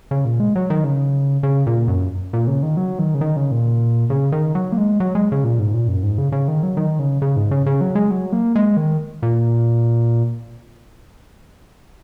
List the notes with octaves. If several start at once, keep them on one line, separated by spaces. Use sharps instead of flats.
C#3
A#2
G#3
F#3
D#3
C#3
C#3
A#2
F#2
A#2
C#3
D#3
F#3
D#3
C#3
D#3
C#3
A#2
C#3
D#3
F#3
A#3
G#3
F#3
G#3
C#3
A#2
G#2
A#2
F#2
G#2
C#3
C#3
D#3
F#3
D#3
C#3
C#3
G#2
C#3
C#3
F#3
G#3
F#3
A#3
G#3
D#3
A#2